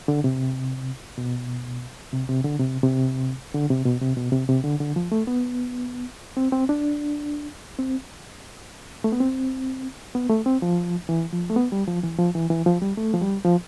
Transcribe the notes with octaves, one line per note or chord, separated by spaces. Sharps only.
D3
C3
B2
C3
C3
D3
C3
C3
D3
C3
B2
C3
B2
C3
C3
D3
D3
F3
A3
B3
C4
C4
D4
C4
A3
B3
C4
B3
A3
C4
F3
E3
F3
A3
B3
G3
F3
E3
F3
E3
E3
F3
G3
A3
F3
G3
F3